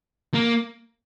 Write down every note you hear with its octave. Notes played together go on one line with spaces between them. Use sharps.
A#3